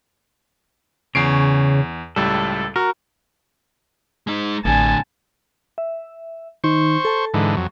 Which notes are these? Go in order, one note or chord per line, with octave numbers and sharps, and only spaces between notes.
E2 C#3 C#5 C7 D7
C#2 A2 G3 A4
F#4 A#4
G#3 D#4
A1 A2 D3 G#5 A5
E5
D#3 D#4 C5 C#6
A4 A5
G#2 D3 E3
F2 F#3